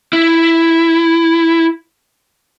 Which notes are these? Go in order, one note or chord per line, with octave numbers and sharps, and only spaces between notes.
E4